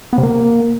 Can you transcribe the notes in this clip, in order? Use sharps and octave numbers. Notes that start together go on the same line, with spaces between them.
B3
C3
A#3